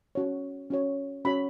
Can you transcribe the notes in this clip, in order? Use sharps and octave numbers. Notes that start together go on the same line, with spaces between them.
C#4 F#4 C#5
C#4 F#4 C#5
C#4 F#4 C#5 B5